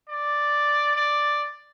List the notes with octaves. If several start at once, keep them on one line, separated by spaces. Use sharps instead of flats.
D5
D5